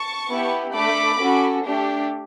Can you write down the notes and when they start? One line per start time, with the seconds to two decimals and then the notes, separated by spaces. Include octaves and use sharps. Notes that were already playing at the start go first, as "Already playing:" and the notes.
Already playing: A5 C#6
0.29 B3 E4 G4
0.74 A3 D4 A4 B5 D6
1.20 C#4 F#4 A4
1.64 A3 D4 G4